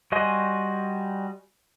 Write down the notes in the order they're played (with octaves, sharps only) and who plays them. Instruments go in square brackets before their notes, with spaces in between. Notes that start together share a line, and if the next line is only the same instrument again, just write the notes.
[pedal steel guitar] G3 F#4 D#5 G#5 C6